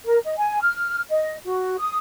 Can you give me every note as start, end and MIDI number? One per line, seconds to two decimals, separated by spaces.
0.05 0.17 70
0.24 0.35 75
0.38 0.61 80
0.62 1.01 89
1.10 1.36 75
1.45 1.78 66
1.79 1.98 87